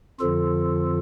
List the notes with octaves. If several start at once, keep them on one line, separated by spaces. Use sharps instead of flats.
F2 D3 F3 F4 A4